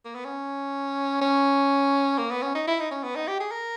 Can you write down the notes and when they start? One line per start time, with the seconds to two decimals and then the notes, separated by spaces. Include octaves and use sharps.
0.05 A#3
0.15 B3
0.25 C#4
1.21 C#4
2.19 A#3
2.31 B3
2.43 C#4
2.55 D#4
2.67 E4
2.80 D#4
2.91 C#4
3.04 B3
3.16 D#4
3.28 G4
3.40 G#4
3.51 A#4